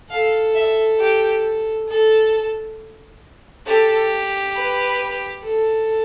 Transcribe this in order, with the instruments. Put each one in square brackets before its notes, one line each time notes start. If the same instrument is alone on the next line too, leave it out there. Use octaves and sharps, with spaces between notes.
[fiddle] A4 [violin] F5
[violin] E5
G4
A4
[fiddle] G4 [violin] A4
[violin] B4
[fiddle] A4